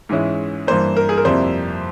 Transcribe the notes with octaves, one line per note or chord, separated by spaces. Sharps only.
G#2 E3 G#3 C#4 E4
G2 E3 A#3 C5
A#4
G#4
A#4
F2 C3 G3 A#3 E4 C5